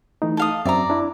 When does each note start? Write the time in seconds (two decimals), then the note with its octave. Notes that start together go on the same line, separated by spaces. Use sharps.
0.22 E3 A3 D#4
0.37 A4 F5 D#6
0.65 F#2 C4 D5 E5 A#5
0.90 D4 E4